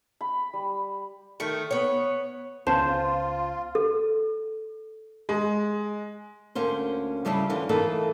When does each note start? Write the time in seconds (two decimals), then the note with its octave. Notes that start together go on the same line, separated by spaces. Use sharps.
0.21 B5
0.53 G3
1.40 D#3 A3
1.71 B3 C#5
2.67 C#2 B3 C#4 F4 C5 A5
3.75 A4
5.29 G#3
6.55 D2 A#3 C#4 C5
7.25 C#3 G3 A3 E4 G#4 A4
7.49 D3 E3 C#4 F4
7.69 E3 A3 A#3 D#4 G#4 A4